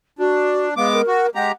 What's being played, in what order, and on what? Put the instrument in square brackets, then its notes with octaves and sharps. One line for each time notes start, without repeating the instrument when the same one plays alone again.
[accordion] D4 [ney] F#4
[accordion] G#3 B3 D6 [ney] F5
[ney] A#4
[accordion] F#4
[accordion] G#3 G4 A#5 [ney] F#5